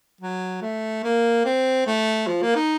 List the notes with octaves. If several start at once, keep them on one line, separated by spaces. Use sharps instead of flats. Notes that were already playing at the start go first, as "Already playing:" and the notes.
F#3
A3
A#3
C4
A3
F3
A#3
D#4